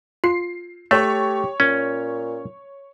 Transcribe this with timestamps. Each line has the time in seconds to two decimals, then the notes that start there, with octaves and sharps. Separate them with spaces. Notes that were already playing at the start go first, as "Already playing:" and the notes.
0.24 F4 C7
0.91 A3 G4 C#5 C#6
1.60 A#2 C#4